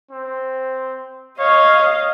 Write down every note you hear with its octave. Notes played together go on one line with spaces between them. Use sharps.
C4
C#5 D#5 F5